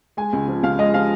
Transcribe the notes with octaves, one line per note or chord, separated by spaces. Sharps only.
G#3 G#5
C#2
F3
C#2 F5
G#3 D#5
F3 F5